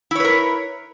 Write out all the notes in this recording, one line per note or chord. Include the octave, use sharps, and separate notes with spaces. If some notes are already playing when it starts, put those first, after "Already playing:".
E4 A#4 B4 C#5